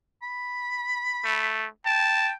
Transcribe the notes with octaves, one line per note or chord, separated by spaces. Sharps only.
B5
A3
G5 A5